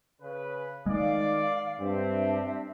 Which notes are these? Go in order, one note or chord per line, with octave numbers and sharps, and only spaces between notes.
C#3 B4
D#3 G#3 D5 F5
G2 C4 D4 E5